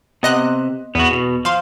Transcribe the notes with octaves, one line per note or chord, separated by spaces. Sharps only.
C3 B3 D#5 F#6
E2 B3 F#4
B2
F3 F5 C6